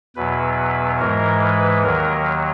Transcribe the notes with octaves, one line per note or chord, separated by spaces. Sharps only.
E2 B2 F#3 B4
G#2 E3 G#3 A#4
B4
D#2 D#3 F#3 A#4